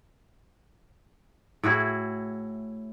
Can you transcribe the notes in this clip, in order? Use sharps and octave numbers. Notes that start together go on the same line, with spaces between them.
A2 E4 F#4 G#4